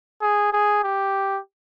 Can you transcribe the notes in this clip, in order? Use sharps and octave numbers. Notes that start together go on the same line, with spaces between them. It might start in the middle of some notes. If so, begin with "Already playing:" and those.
G#4
G#4
G4